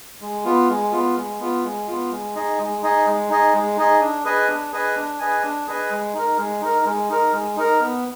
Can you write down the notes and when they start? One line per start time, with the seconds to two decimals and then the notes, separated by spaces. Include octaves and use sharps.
0.21 G#3
0.45 B3 F4
0.69 G#3
0.92 B3 F4
1.16 G#3
1.40 B3 F4
1.64 G#3
1.87 B3 F4
2.11 G#3
2.35 D#4 G#4 D#5
2.59 G#3
2.82 D#4 G#4 D#5
3.06 G#3
3.29 D#4 G#4 D#5
3.54 G#3
3.77 D#4 G#4 D#5
4.00 D4
4.24 G#4 B4 D#5 G#5
4.48 D4
4.72 G#4 B4 D#5 G#5
4.96 D4
5.19 G#4 B4 D#5 G#5
5.43 D4
5.67 G#4 B4 D#5 G#5
5.90 G#3
6.14 D#4 A#4
6.38 G#3
6.61 D#4 A#4
6.85 G#3
7.09 D#4 A#4
7.33 G#3
7.56 D#4 A#4
7.81 B3